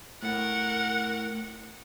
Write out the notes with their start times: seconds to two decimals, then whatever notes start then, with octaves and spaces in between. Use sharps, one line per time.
0.22 A2 A#4 F#5